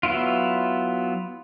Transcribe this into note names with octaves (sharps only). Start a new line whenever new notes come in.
F#3 B3 E4 F4